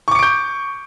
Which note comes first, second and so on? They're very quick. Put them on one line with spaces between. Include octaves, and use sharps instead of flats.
C#6 D6 C#7 D7 G6